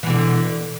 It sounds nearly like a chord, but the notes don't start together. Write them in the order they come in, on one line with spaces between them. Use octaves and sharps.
E3 B2 D3